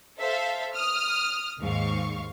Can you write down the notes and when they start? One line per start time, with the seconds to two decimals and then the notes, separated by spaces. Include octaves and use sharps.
0.18 A4 C5 E5 F5
0.74 D#6 F6
1.60 D#2 G#2 F5 C#6